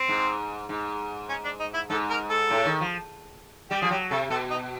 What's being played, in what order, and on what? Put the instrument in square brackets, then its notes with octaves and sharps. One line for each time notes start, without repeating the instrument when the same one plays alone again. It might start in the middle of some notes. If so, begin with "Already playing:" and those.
Already playing: [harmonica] C4
[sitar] G#2
G#2
[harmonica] C#4
D4
D#4
E4
[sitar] G#2 [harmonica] A4
[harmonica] A#4
A4
[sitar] A2
D#3
F3
[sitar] G3 [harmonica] G4
[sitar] F3 [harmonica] G#4
[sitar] F#3 [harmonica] G4
[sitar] C3 [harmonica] A4
[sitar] B2 [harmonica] A4
[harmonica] D#4